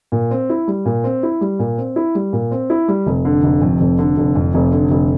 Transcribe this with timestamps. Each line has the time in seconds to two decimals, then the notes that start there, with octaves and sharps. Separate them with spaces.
0.12 A#2
0.31 C4
0.50 E4
0.68 G3
0.85 A#2
1.04 C4
1.23 E4
1.41 G3
1.59 A#2
1.78 C4
1.96 E4
2.15 G3
2.33 A#2
2.51 C4
2.70 E4
2.88 G3
3.06 F1
3.25 D3
3.43 F1
3.62 F2
3.80 F1
3.99 D3
4.17 F1
4.35 F2
4.54 F1
4.72 D3
4.91 F1